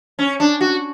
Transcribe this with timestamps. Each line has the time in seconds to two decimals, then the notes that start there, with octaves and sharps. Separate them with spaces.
0.19 C#4
0.40 D4
0.61 F#4